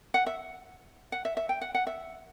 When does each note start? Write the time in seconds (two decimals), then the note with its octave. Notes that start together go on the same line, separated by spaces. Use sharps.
0.14 F#5
0.26 E5
1.12 F#5
1.25 E5
1.37 E5
1.49 G5
1.61 F#5
1.75 F#5
1.87 E5